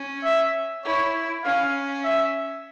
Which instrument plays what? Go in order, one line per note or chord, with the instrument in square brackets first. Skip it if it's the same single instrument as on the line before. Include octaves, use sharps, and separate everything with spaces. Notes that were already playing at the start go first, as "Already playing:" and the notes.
Already playing: [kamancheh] C#4
[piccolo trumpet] E5
[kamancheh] E4 [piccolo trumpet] C#5
[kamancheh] C#4 [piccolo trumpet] F5
[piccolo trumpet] E5